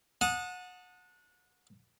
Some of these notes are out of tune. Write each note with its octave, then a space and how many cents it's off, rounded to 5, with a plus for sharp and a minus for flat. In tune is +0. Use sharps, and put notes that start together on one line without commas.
F#5 -25 A5 +10 D#6 +0